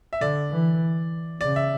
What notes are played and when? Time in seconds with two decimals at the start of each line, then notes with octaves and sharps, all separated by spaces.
0.13 E5
0.21 D3 D5
0.51 E3
1.41 C#3 D5
1.56 E5